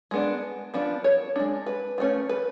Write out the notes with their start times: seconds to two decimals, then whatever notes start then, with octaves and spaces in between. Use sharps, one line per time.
0.11 G#3 B3 D4
0.74 F3 B3 D4
1.04 C#5
1.36 G#3 D4
1.66 B4
1.98 F3 A3 C#4
2.29 B4